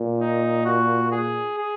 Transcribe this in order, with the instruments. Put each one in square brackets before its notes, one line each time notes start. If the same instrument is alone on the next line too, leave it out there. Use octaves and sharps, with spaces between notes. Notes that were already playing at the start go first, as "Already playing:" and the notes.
Already playing: [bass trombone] A#2
[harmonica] D#4
F#4
G#4
G#4